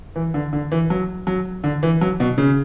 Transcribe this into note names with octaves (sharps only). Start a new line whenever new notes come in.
E3
D3
D3
E3
F#3
F#3
D3
E3
F#3
B2
C#3